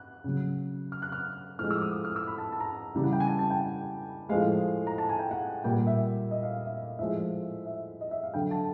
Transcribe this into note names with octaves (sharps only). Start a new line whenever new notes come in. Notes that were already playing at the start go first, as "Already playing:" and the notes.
Already playing: F#6
C#3 F#3
F6
F#6
F6
A2 F3 G#3 F6
E6
D6
D#6
D#6
F6
E6
B5
A5
A5
A#5
C#3 E3 G3
F#5
G5
G#5
A5
A5
G5
A2 F3 G#3 F5
A#5
A5
G#5
G5
F#5
A#2 G3 G5
E5
D#5
F5
F5
E5
A2 F3 G#3 E5
E5
D#5
E5
F5
D3 F#3 G5
A5